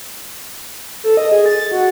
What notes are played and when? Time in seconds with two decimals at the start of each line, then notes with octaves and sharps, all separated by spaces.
1.04 A4
1.17 D#5
1.32 G#4
1.46 A6
1.72 F#4